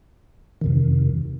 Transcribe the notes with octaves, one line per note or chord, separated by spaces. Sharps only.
F2 C3 D#3